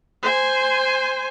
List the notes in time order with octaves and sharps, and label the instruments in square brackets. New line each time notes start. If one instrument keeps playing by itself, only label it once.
[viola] C5 G#5